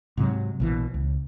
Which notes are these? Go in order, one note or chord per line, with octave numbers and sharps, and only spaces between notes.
G#2 C3 F3 F#3
A#1 B2 E3
C#2